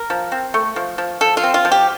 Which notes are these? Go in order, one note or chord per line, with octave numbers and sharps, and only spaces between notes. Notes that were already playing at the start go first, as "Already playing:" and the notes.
Already playing: A#4
F3
C4
A3
F3
F3
F3 A4
F4
C4
F4
F3
G4